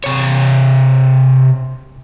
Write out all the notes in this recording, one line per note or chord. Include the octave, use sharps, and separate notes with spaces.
C3 C#5